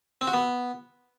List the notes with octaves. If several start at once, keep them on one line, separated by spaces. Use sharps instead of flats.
C4
F#4
B3